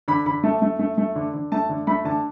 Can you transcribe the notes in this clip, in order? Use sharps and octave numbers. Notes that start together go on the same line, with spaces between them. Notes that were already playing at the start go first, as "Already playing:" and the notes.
D3 B5
D3 B5
A3 A5
A3
A3
A3
D3
D3
A3 A5
D3
A3 B5
D3 A5